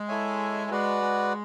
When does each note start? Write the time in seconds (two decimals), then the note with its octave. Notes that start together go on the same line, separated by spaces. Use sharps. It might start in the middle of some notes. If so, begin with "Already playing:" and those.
Already playing: G#3
0.08 E4 A4 C#5 E5 G#5
0.70 G#3 F#4 B4 D5 F#5
1.02 G#3